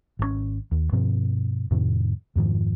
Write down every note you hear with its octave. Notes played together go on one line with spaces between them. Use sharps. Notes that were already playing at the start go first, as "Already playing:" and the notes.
G#1 B2 C#4
D#2
G2 B2 F3 C4
F2 A2 C3 D#3
F2 G#2 D#3 F3